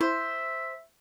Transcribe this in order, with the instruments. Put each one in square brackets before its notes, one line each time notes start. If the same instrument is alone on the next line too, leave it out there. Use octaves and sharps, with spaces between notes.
[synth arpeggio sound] E4 [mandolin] C5 [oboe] E5